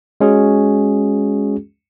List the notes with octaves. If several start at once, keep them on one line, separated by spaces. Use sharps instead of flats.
G#3 C#4 F#4 G#4